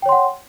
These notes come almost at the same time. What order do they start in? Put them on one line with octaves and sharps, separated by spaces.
G5 C#5 C6 F#5